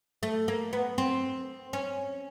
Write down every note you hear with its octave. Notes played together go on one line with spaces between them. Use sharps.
A3
A#3
B3
C4
C#4